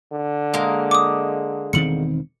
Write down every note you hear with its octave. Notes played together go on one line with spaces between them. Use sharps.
D3
G#3 A#3
D6 D#6
E1 D#3 C4 C#7 F#7